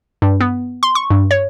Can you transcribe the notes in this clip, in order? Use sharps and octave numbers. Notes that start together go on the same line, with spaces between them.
G2
B3
C6
C#6
G2
C#5